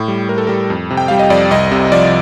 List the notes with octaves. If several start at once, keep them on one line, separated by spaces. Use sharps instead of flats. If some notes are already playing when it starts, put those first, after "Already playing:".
Already playing: A2
G3
A2 A#4
A4
G3 A#4
F2
C3
G5
G3 F5
D#5
F2 D5
C2 D#5
C3
F3 D5